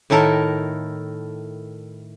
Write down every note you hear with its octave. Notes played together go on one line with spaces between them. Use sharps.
A2 D#3 E4 A4 A#4